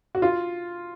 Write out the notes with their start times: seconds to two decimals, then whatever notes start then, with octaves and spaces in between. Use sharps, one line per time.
0.15 F#4
0.22 F4